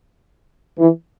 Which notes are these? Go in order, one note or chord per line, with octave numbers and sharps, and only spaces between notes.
E3